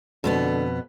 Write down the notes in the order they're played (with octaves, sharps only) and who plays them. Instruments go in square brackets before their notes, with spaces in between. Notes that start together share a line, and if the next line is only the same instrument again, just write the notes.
[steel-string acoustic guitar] F2 B2 B3 [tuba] D3